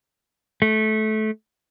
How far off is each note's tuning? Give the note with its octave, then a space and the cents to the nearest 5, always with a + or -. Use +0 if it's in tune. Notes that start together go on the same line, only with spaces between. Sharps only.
A3 -20